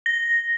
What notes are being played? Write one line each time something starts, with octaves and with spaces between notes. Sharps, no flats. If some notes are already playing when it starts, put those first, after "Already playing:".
A#6